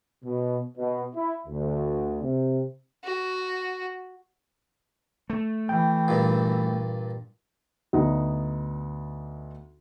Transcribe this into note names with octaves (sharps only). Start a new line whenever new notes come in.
B2
B2
E4
D2
C3
F#4
A3
E3 G5
G2 A#2
D2 B3 D#4